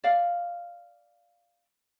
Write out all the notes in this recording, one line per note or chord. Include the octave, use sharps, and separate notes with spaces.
D5 F5